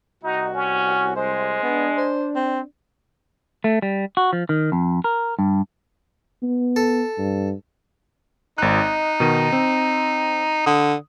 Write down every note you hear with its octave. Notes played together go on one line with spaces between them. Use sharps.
C2 D#4 F#4
C#4
G#3 C5
B3 D4
C5
C4
A3
G3
F#4
F3
D#3
F2
A#4
G2
B3
A4
G2
G#1 D#4 F#6
D#5
B2 D#3 D#7
C4
D3 D#6